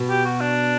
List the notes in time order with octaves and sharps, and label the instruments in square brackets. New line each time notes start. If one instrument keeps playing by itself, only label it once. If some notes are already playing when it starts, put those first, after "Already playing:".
Already playing: [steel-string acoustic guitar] B2
[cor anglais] G4
F#4
D4